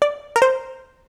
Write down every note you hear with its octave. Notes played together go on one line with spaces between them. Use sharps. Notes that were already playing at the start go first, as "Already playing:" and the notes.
D5
A#4
C5